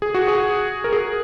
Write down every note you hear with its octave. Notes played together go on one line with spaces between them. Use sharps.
G#4
F#4
G#4
A#4
G#4